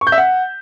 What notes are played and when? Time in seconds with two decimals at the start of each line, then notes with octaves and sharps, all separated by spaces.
0.01 C#6
0.07 G6
0.12 E5
0.18 F#5